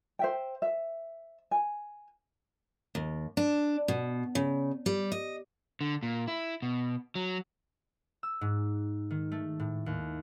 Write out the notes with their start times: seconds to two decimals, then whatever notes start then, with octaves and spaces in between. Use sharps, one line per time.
0.19 C5 E5 G5
0.62 E5
1.51 G#5
2.95 D#2
3.37 D4
3.88 B2
4.35 C#3
4.86 G3
5.12 D#5
5.81 D3
6.03 A#2
6.28 E4
6.62 B2
7.15 F#3
8.23 E6
8.41 G#2
9.11 D#3
9.32 A3
9.60 A2
9.86 D#2